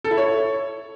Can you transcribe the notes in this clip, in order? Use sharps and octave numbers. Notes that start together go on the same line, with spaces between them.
A4
E4
C#5